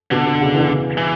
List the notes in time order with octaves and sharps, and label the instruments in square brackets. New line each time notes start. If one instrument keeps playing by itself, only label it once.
[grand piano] B2 [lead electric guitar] D3
[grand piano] B2
C#3
E3
[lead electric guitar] E3